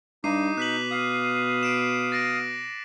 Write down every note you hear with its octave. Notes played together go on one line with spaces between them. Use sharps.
G2 D#4 D6 C7 D#7
B2 F#6 B6 F#7
F5 D#6
C7 D7 E7
A6 A#6 D7